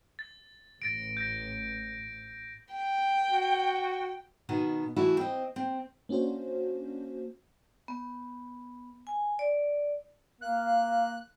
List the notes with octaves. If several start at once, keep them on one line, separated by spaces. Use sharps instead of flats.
A6
A1 A6 A#6 D7
G6 A#6
G5
F#4
B2 D#3 B3
E3 A3 E4 F#4
C4 D#5
C4
A#3 C#4 D4 F#4 C5
B3
G#5
D5
A#3 F5 F#6